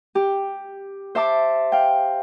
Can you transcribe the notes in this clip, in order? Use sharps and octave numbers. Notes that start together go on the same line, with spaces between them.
G4
C5 E5 A5 D6
F5 G5